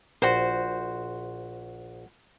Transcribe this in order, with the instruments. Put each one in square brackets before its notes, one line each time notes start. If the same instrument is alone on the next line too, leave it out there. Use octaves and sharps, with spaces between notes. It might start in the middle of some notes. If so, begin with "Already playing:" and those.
[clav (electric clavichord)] A#1 [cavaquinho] F#4 C5